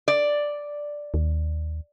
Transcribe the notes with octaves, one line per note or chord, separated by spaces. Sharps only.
D5
D#2